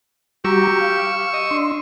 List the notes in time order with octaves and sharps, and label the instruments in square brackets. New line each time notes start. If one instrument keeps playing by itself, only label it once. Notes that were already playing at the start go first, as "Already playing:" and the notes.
[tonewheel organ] G3 F#4 A#5 [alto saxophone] G4 [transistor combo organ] C#6 E6
[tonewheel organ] F5
[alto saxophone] D#5
[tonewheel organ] D4 C6